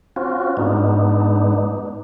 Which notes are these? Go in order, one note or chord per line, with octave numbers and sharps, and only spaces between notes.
C4 C#4 F4 F#4
G#2 B3 D4 D#4